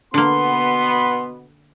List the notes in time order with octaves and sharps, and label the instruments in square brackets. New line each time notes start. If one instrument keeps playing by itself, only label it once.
[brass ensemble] B2 B3 [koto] D3 A#3 [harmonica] C6